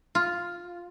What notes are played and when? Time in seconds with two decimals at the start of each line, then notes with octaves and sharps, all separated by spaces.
0.15 F4